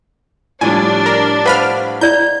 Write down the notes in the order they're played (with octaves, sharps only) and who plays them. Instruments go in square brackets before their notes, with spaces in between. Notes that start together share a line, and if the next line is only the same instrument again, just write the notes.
[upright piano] A2 F3 G3 [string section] D4 [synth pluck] G#5
[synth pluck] A#4
[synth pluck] B4 B5 F6 [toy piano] C5 F5 F#5
[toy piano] E4 D5 [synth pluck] G6